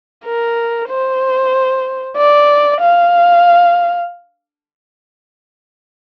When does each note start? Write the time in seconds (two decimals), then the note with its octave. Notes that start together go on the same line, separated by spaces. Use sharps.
0.25 A#4
0.89 C5
2.16 D5
2.80 F5